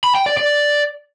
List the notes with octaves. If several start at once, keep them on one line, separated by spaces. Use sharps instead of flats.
B5
G5
D5
D5